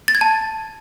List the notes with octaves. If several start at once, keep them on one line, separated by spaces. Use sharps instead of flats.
A6
G#6
A5